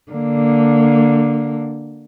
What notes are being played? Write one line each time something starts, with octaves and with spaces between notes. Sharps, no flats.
D3 A#3